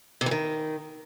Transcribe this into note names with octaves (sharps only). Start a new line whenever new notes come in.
C3
E3
D#3